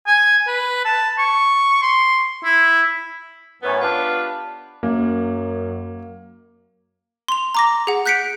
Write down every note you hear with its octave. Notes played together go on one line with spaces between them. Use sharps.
G#5
B4
A5
C#6
C6
E4
F#2 A2 B3 C#4
B3 D4 F4 G4 B4
F#2 A#3
C6 F7
A#5 D6 A#6
G#4 F#5
F#6 G6 B6 C#7 D7